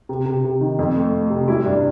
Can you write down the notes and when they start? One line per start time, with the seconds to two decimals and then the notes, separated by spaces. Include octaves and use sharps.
0.09 C3
0.26 C3
0.44 C3
0.61 D#3
0.79 F2
0.96 A3
1.13 A3
1.30 C3
1.48 G3 E4
1.65 G2 D4